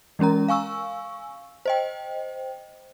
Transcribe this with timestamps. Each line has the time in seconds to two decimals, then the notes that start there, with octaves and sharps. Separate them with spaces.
0.19 E3 G#3 C#4 A#4 A#5
0.48 F5 G#5 C#6 E6
1.66 C5 D#5 G5